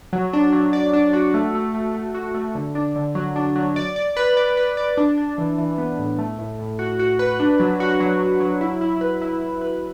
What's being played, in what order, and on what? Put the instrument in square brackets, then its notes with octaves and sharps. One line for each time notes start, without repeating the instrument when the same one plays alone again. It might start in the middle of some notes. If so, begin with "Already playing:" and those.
[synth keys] F#3
D4
F#3
D5
D4
F#4
A3
A3
A3
A3
F#4
A3
D3
D4
D3
F#3
D4
F#3
D5
D5
B4
D5
B4
D5
D4
D4
E3
E3
B3
A2
A3
A2
A2
F#4
F#4
B4
D4
F#3
F#4
F#3
F#3
F#3
E4
E4
B4
E4
E4
B4